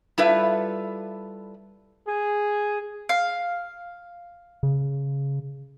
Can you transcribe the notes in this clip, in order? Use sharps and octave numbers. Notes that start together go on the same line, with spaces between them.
G3 E4 F4 A4 B4 E5
G#4
F5
C#3